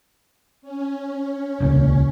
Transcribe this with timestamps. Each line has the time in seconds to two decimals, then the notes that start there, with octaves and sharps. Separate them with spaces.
0.62 C#4
1.60 D#1 C#2 A#2